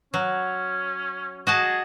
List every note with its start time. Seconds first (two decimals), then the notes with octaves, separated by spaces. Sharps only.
0.14 F#3 C#4
1.47 F#4 G#4 D#5 A5